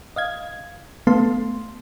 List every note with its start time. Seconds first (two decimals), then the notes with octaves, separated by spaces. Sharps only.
0.16 D#5 F5 G#6
1.07 A3 B3 F5 A5 C6